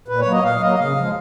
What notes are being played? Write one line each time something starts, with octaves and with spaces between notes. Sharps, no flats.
A#2 B4
C#5
F#3 A#3
D#5
A#2 F5
F#3 A#3 D#5
C#3 F5
F3 G#3